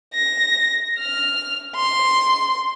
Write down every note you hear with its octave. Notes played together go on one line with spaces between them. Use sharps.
A#6
F6
C6